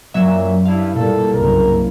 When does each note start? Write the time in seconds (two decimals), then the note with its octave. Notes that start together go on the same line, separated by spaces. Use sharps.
0.14 F#2 A#2 F#3 E5
0.65 G2 E4 F5
0.95 A#2 G3 A4
1.34 F#1 C2 G2 A#4